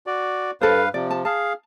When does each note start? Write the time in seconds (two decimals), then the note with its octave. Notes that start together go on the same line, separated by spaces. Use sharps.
0.07 F#4 D5
0.61 G2 A4 B4 C5 F5
0.94 C3 F3 D5
1.11 A5
1.25 G#4 F5 A5